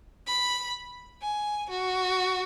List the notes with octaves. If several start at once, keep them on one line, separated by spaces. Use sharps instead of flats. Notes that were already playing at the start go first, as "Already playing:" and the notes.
B5
G#5
F#4